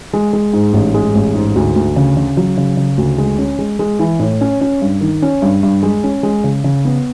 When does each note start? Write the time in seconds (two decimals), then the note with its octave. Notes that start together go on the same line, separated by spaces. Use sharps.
0.14 G#3
0.33 G#3
0.53 G#2
0.73 A1
0.94 G#3
1.15 A1
1.35 G#2
1.56 D2
1.76 D2
1.96 C#3
2.17 C#3
2.37 F#3
2.57 C#3
2.77 C#3
2.97 D2
3.18 G#3
3.38 C#4
3.59 G#3
3.79 G#3
3.99 E3
4.20 A2
4.41 C#4
4.61 C#4
4.82 G2
5.01 D#3
5.22 C#4
5.42 G2
5.63 G2
5.83 G#3
6.04 C#4
6.23 G#3
6.44 C#3
6.64 C#3
6.85 B3